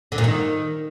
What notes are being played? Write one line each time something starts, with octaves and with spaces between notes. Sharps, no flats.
D3
A#2
D#3